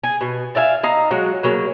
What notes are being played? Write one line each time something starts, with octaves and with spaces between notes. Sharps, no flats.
G#4
B2
D5 E5 F5 G#5
D#4 F5 A#5
F#3 G#3 F#4
C#3 F#3 A#3